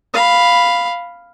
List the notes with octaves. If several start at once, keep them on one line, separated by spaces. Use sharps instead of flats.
F5 B5